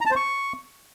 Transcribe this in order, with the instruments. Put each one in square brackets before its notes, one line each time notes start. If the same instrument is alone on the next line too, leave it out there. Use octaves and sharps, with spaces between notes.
[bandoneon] A#5
A5
C5
C#6